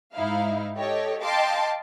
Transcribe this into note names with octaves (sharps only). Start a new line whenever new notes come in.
G#2 D#4 E4 F5
G4 A4 C#5 D#5
D#5 F5 G5 A5 C6 D6